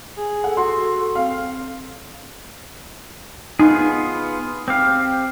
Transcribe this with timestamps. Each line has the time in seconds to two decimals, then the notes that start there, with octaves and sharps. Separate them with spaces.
0.17 G#4
0.44 A4 F#5
0.57 F#4 C6
1.15 C4 F5
3.60 B3 D#4 F4 G#4
4.68 C4 G4 F5